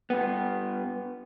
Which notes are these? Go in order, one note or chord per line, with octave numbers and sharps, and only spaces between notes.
G2 B3